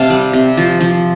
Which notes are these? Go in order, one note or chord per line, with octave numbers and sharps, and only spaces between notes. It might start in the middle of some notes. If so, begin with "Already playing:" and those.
Already playing: C3 F5 A5
G3
C3
F3
F3